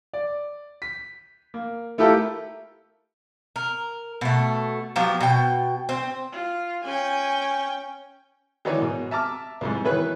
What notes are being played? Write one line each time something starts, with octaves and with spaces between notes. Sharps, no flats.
D5
B6
A#3
A3 E4 F4 G4 A4 A#4
A#4
B2 A3
F3 F#3 B3 G4
B2 G5
C4
F4
C#4 G5 G#5
D#3 E3 D#4 F#4 C#5 D5
G#2 B2
E5 A5 A#5 D6 F6
C2 F2 G#2
B2 D#3 E3 B4 C#5 F#6